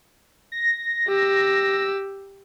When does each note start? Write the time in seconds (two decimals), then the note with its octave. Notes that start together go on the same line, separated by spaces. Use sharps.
0.52 A#6
1.08 G4 E6